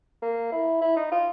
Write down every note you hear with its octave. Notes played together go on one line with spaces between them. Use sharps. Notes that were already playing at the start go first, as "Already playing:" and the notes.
A#3
E4
E4
D#4
F4